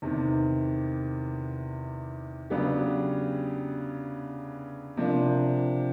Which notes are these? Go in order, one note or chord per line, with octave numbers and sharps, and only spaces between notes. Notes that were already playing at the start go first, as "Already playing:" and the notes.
E2 C3 D#3
C#3 F#3 B3 D4 G4
C3 F3 A#3 D4